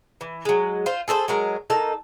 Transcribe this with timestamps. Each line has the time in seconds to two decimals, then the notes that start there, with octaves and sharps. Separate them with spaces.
0.21 E3
0.45 F#3 G#3
0.86 F4 C5
1.08 G#4 A4 B4 C5
1.28 F#3 G#3 A#4
1.70 A#3 D#4 A4 A5